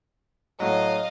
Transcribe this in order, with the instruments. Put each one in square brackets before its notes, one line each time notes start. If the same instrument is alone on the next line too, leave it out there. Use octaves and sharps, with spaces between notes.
[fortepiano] A2 F#3 [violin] D#5 F5